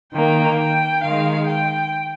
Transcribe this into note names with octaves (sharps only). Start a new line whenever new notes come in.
D#3 A#3 G5
G5
D#3 G#3 F5
G5